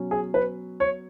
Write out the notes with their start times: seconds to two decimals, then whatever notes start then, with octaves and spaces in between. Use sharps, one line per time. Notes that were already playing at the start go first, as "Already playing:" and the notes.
Already playing: B2 F#3 C#4
0.11 G#4
0.34 B4
0.80 C#5